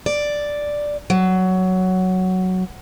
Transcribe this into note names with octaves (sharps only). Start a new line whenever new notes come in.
D5
F#3